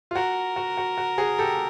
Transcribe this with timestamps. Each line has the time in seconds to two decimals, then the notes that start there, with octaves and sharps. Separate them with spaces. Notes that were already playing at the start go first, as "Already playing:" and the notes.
0.11 F4
0.15 F#4 A#4
0.56 F#4
0.77 F#4
0.98 F#4
1.18 F#4 G#4
1.39 G4 A4